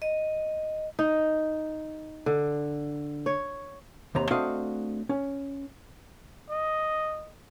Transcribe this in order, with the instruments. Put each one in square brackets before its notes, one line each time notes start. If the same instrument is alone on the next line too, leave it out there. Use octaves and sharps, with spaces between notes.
[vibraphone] D#5
[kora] D#4
D3
C#5
[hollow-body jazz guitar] D#2 C3 A#5
A3 C4 D4 F#4 D#5 F5
C#4
[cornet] D#5